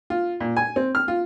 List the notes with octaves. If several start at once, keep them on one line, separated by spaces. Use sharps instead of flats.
F4
A#2
G#5
C4
F6
F4